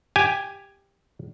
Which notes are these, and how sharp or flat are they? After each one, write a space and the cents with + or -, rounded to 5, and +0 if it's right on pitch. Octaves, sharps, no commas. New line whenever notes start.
G4 +10 G#5 +0